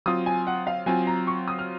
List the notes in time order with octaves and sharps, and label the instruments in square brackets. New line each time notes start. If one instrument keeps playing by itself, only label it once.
[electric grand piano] F#3 C4 F4 [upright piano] D#6
[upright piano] G#5
F#5
F5
[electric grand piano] F#3 C4 F4 [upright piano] G#5
[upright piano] A#5
C#6
D#6
F6